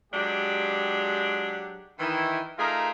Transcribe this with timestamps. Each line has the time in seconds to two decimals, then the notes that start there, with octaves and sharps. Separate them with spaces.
0.13 F#3 G#3 D4 G4
1.99 D#3 E3 E4
2.58 A3 D#4 F4 G#4 A#4